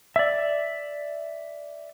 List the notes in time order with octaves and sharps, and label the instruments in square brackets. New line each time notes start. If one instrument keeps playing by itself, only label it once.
[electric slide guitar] D5 E5